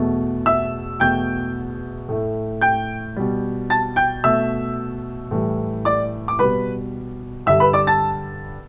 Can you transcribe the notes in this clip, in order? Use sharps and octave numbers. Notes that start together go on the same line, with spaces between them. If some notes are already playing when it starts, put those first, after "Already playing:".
Already playing: E2 B2 A3
E5 E6
E2 B2 A3 G5 G6
A2 A3
G5 G6
B2 G3
A5 A6
G5 G6
B2 A3 E5 E6
A2 E3 G3
D5 D6
D6
B2 G3 B4 B5
G2 D3 G3 E5 E6
B4 B5
D5 D6
A5 A6